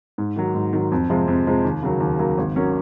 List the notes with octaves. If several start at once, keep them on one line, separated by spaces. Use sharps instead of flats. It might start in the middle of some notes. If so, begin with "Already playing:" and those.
G#2
D#3 F#3
G#2
D#3 F#3
F2
C3 F3 G#3
F2
C3 F3 G#3
D#2
C#3 F#3 A#3
D#2
C#3 F#3 A#3
G#1
F#3 A#3 C#4